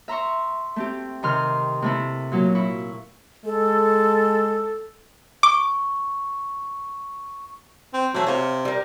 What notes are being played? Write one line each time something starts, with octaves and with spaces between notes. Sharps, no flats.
E5 A#5 C6 C#6
A3 C4 G4
C3 D#3 C6 F6
C3 A3 E4
A#2 F#3
E4 C#6
G#3 A4
C#6 D6
C4
E3 F#3 A3 C5
C3 C#5 F5
G3 A#4